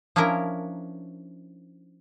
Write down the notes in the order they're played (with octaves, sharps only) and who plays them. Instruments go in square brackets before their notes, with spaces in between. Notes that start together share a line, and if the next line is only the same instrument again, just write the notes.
[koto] F3 C#4 D4 E4 A#4